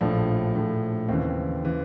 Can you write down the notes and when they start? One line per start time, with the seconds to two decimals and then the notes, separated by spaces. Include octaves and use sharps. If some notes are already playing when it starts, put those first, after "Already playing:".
0.01 A#1 A2 F3 D4
0.54 A#1 A2 F3
1.08 D#2 C#3 E3 C4
1.64 C#3 E3